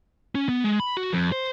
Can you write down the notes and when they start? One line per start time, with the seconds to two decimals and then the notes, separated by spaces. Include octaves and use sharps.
0.35 C#4
0.49 B3
0.64 G#3
0.80 B5
0.97 F#4
1.13 F2
1.32 C5